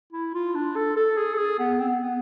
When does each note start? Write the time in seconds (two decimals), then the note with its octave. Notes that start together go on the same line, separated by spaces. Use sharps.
0.13 E4
0.34 F4
0.55 D4
0.76 A4
0.96 A4
1.18 G#4
1.34 A4
1.38 G#4
1.59 B3
1.80 C4
1.87 B3
2.03 B3